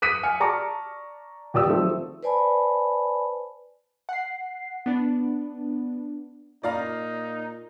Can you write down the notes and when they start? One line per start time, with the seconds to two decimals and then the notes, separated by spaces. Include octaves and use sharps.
0.02 D6 D#6 F#6 B6 C#7 D#7
0.23 G#5 F6 C#7
0.40 D5 A5 A#5 C#6 D6 C#7
1.54 D#1 G4 D5 D#6 E6
1.67 D#3 F3 F#3 A3 C4
2.23 B4 C5 D5 G#5 A5 B5
4.09 F#5 C7
4.86 B3 D4
6.63 A#2 D#4 D5 F5 A#5